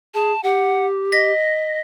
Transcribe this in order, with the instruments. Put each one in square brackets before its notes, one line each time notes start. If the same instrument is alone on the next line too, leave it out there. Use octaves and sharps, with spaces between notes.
[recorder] G#4 [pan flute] A5
[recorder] G4 [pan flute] F#5
[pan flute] D#5 [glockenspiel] A#6 B6